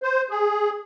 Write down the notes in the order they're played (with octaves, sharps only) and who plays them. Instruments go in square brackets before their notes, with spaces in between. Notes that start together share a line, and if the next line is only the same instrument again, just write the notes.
[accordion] C5
G#4